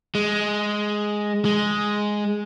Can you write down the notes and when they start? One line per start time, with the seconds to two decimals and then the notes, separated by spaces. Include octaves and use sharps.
0.15 G#3
1.45 G#3